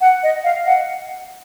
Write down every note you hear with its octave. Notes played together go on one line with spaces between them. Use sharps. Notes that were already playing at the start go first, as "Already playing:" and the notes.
F#5
D#5
F5
F#5